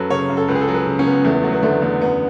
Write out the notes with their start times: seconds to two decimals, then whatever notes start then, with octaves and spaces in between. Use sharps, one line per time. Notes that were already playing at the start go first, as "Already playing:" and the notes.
Already playing: F#2 F#3 A4 B4
0.10 C#3 C#5
0.29 F#2
0.37 A4
0.48 C#2 B4
0.55 G#4
0.61 A4
0.68 F#3
0.74 B4
0.86 C#3
0.99 C#4
1.05 C#2 B3
1.24 E2 A3
1.34 B3
1.43 F#3 A3
1.53 B3
1.63 D3 A3
1.82 E2 A3
2.01 F#2 B3